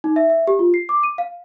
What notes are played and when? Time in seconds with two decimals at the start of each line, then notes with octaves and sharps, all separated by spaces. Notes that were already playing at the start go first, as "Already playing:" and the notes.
0.04 D#4
0.16 E5
0.30 E5
0.47 G4
0.59 F4
0.74 C7
0.89 D6
1.03 D#7
1.18 F5